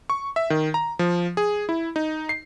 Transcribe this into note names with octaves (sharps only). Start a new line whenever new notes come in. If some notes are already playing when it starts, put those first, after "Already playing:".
C#6
E5
D#3
A#5
F3
G#4
E4
D#4
C7